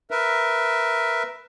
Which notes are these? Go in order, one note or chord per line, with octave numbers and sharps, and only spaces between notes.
A#4 B4 E5